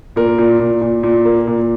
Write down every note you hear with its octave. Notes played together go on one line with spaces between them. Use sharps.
A#2 A#4
A#2
A#2
A#2
A#2
A#3
A#2